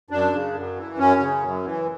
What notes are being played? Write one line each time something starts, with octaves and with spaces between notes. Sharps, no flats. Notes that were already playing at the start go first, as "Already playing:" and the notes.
F#2 D4
C#3
F#2
E3
F#2 C#4
C#3
F#2
E3